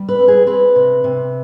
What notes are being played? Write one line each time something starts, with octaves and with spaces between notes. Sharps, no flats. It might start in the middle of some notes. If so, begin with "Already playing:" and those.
Already playing: G3
B4
C4
G#4
C4 B4
C3
C3